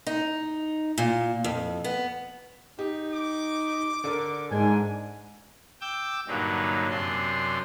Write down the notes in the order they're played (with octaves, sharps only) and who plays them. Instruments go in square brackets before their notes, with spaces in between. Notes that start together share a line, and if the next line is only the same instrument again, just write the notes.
[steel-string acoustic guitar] D#4
A#2
F2
B3
[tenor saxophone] D#4 [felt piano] G4
[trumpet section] D6
[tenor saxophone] D3 [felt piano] A#4 D5
[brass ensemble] G#2 G#5 [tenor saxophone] D4
[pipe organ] G5 D6 E6 G6
G2 A#2 D3 F#3 D#4
F#2 C3 D4 C6